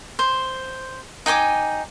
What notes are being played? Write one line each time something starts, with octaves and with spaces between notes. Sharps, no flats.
C5
D#4 G5 G#5 D6